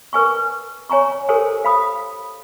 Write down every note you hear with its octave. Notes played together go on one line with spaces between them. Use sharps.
A#4 B4 G#5 C#6
C#5 G#5 A#5 C#6
G4 A4 A#4 C5 C#5 G#5
F5 B5 D#6